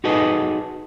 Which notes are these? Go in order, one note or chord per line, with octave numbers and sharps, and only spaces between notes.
D#4 F#4 G#4 A4 B4 D#5